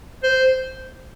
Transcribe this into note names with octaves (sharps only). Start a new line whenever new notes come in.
C5